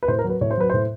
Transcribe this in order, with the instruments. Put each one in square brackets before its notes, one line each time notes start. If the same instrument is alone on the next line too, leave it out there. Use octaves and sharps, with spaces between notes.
[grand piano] B4
A2 C5
A#4
F#3
B4
A2 C#5
C5
F#3 B4
A2 C5